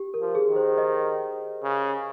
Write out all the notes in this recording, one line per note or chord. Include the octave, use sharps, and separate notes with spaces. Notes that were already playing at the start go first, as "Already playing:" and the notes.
Already playing: G4
A#4
F3
G#4
D#3
C5
D#5
C#3